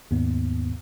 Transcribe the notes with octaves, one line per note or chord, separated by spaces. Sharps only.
D#2 G#2 B3